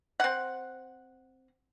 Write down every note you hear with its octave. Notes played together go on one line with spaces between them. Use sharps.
C4 F#5